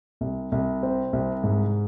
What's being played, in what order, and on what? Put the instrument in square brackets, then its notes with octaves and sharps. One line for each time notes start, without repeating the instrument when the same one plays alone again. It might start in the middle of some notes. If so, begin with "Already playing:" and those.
[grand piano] C2
C2
C4
C2
G#2